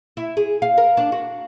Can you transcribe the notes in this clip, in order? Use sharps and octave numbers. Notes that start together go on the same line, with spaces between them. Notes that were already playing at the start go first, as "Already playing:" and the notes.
E4
G#4
F5
A#4
D4
F#4